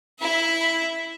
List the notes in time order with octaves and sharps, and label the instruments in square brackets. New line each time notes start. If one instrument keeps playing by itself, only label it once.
[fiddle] E4 E5